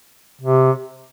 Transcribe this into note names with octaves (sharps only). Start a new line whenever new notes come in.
C3